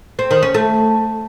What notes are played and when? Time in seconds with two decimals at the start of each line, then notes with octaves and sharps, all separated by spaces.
0.19 C4
0.31 D#3
0.43 C#4
0.54 A3